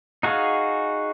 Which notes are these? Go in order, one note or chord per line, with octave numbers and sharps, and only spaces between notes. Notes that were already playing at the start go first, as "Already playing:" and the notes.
D#4 F#4 G#4 F5